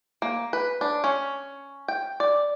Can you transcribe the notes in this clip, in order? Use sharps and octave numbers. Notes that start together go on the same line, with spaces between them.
A#3
B4
D4
C#4
G5
D5